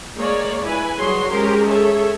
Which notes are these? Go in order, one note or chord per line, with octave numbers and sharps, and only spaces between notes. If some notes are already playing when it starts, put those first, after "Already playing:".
G#3 A#3 C#5 D5
E4 B4 G#5
F#3 G3 F#4 G#4 C#5 C6
G#3 C#4 G4 A#4 C5
G#4 A4 C#5 E5